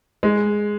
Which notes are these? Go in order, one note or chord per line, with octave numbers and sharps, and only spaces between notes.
G#3